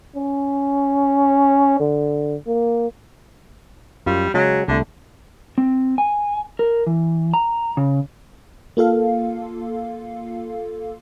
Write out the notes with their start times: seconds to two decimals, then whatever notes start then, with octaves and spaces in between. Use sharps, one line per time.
0.16 C#4
1.80 D3
2.47 A#3
4.06 F#2 G3 F4
4.34 C#3 F#3 G#3 C#4
4.68 C2 D3 A3
5.58 C4
5.98 G#5
6.59 A#4
6.87 E3
7.34 A#5
7.77 C#3
8.77 A#3 F4 A4 F5